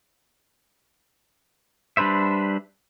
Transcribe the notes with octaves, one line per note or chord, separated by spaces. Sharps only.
G3 D4 B4 C5 E5